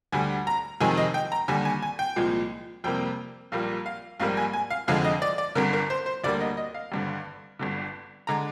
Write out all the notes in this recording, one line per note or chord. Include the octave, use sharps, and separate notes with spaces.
D2 D3 G3 G#5
A#5
F2 C3 D#3 G#3 G#5
D#5
G5
A#5
D#2 D3 G3 G#5
G#5
G#5
G5
C2 A#2 F3 G#3
F2 C3 G3 A#3 G5
A#1 A#2 G3 A#3 F5
F5
A#1 G#2 G3 A#3 F5
G#5
G#5
F5
F1 F2 D3 G#3 F5
D#5
D5
D5
G1 G2 D3 A#4
A#4
C5
C5
D2 D3 G3 A#3 D5
D#5
D#5
F5
G#1 G2 D3
G1 G2 D3
D3 G#3 A#5